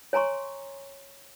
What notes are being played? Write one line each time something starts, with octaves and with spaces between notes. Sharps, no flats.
C#5 G#5 A#5 C6 C#6